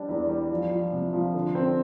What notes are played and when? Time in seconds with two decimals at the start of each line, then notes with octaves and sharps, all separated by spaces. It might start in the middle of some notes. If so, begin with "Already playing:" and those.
Already playing: G3 D4
0.09 E2
0.29 G3
0.51 F3
0.71 F3
0.92 C3
1.13 F3
1.34 D3
1.55 C4